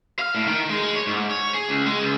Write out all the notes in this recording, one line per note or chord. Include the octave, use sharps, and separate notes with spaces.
F5
A2
D#3
G#3
G#3
C#5
G#2
C#5
G#4
C#2
G#3
C#2